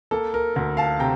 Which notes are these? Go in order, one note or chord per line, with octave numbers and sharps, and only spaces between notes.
A#3 A4
A#4
D2 A#4
F5 A5
C3 G5 A#5